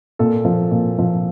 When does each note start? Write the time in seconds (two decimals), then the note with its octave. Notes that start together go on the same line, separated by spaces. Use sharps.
0.19 A#2 A4
0.45 F3
0.71 A#2
0.98 F3